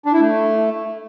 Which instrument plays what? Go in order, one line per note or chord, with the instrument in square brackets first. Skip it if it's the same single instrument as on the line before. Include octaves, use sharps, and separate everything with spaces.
[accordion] D4
E4
A3